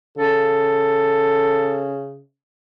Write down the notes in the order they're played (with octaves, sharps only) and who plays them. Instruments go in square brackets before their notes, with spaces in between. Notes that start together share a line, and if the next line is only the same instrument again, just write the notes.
[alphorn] C#3 [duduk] A4